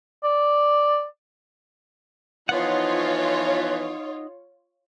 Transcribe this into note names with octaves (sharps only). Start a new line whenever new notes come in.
D5
E3 F3 B3 D#4 F4 C#5 F#5